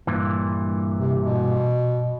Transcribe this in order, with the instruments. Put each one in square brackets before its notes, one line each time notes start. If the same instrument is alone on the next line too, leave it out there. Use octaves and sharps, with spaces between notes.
[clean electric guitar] G2 A#2 E3
[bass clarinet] C3
B2